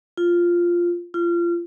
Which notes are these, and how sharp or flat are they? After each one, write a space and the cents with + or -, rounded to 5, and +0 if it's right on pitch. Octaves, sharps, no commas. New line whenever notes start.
F4 -5
F4 -25